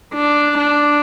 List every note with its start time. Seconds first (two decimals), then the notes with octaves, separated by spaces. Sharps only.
0.14 D4
0.58 D4